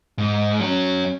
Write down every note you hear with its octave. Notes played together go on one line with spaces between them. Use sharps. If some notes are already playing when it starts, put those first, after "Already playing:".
G#2
F#3 C#4